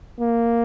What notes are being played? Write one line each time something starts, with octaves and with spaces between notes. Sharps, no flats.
A#3